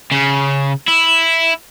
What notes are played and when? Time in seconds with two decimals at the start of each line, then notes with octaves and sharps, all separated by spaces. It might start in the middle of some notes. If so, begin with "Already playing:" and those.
0.12 C#3
0.88 E4